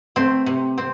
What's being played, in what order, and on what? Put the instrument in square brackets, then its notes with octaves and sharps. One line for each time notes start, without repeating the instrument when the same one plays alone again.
[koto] A3 C4
C3
C4